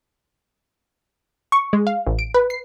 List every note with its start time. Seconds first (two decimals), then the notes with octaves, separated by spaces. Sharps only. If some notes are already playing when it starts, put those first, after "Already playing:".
1.52 C#6
1.73 G#3
1.87 F5
2.06 A1
2.19 D7
2.34 B4
2.50 C7